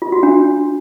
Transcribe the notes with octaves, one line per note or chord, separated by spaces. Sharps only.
F4
F#4
D4